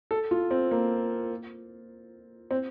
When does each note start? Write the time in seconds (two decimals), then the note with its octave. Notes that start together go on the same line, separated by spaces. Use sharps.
0.11 A4
0.31 F4
0.51 C4
0.71 A#3
2.51 C4